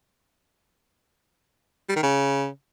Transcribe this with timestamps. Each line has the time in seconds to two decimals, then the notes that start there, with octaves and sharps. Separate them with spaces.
1.89 G3
1.96 D#3
2.03 C#3